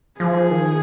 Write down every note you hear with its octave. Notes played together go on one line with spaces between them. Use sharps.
F3 G#4
D#3